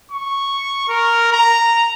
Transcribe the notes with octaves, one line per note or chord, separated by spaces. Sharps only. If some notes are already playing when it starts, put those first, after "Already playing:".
C#6
A#4
A#5